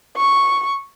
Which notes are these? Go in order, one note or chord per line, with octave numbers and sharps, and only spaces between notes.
C#6